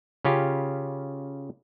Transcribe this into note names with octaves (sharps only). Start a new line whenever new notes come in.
C#3 C#4 F4 G4